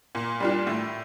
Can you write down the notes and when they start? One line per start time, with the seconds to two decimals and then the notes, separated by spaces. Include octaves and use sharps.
0.15 A#2
0.40 G3 D4 F4
0.67 A2